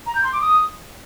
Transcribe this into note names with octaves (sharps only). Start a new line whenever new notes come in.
A#5
G6
C6
D6
D#6